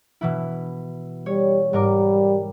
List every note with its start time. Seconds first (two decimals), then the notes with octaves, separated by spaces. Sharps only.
0.21 B2 E3 E4
1.26 G3 C#5
1.73 G#2 G3 A#4 D6